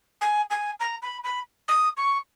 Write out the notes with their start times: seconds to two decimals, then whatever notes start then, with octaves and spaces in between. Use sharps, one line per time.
0.21 G#5
0.50 G#5
0.80 A#5
1.02 B5
1.24 B5
1.68 D#6
1.97 C#6